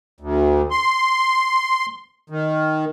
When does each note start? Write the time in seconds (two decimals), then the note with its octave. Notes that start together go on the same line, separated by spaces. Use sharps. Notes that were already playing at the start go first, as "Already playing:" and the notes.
0.20 D2
0.71 C6
2.30 D#3